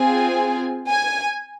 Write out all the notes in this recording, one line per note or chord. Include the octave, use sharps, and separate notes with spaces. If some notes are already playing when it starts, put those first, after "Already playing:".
Already playing: C4 F4 G#4 G#5
G#5